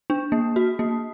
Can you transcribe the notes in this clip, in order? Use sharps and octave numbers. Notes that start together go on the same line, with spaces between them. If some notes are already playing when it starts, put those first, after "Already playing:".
D4
A#3
F#4
A#3